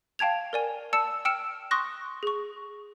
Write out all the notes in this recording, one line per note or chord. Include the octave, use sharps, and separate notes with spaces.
F5 G5 A5 G#6 F7
A#4 D5 G#5
D5 A5 E6 C#7 E7
G5 E6 F6 C#7 D7 E7
C6 C#6 D#6 F#6 A#6
G#4 C#6